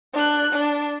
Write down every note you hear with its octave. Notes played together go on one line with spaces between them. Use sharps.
D4 F#6
D4